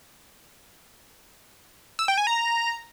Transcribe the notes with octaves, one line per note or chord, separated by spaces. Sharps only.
E6
G5
G#5
A#5